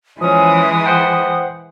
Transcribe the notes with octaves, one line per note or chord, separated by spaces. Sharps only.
E3 F3 G#3 C#4 D#6
C5 F#5 G5